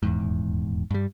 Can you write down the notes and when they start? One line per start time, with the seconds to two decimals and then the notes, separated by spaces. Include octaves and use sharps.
0.03 D#1 E2 G#2
0.91 G2 G3